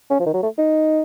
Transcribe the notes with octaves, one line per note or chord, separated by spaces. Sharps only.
C#4
F3
D#3
F#3
A3
D#4